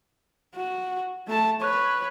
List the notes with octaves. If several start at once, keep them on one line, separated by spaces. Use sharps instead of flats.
F#4
A3 A5
B4 C#5 C#6 F#6